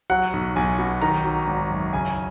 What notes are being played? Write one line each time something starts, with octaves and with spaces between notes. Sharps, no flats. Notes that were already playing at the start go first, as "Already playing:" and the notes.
F#3 F#5
B1
B1 G#5
B2
D#3 A#5
F#3
G#1
F#2
C#3 G#5